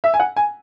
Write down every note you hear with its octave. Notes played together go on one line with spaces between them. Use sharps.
E5
G#5
F#5
G#5